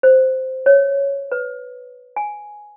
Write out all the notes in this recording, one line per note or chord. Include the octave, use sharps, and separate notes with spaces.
C5
C#5
B4
G#5